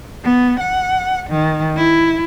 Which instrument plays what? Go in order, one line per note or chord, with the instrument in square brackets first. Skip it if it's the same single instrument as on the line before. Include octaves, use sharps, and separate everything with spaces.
[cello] B3
F#5
D#3
E4